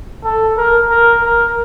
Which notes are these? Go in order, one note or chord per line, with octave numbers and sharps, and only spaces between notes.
A4
A#4
A#4
A#4